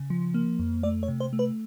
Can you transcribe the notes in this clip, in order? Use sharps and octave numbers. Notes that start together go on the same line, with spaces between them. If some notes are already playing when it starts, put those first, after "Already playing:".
Already playing: C#3
F3
A#3
F2
A3 D5
C#5
C3
C5
A3
B4